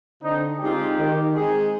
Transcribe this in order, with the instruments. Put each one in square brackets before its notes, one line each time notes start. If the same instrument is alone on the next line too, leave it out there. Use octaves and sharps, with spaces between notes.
[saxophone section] D3 [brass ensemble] C4 D#4
[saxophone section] G#3 C4 F4 G#4 [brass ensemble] D#4 G4
[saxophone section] D#3
G#3 C4 D#4 G#4